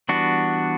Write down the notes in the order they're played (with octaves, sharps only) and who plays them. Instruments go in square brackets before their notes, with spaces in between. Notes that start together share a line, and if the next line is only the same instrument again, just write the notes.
[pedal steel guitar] E3 G3 B3 D4 F#4